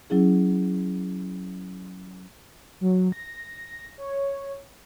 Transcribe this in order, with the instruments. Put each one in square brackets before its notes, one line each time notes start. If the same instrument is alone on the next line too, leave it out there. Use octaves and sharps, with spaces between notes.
[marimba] F#3 C#4 E4 G#4
[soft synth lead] F#3
A#6
C#5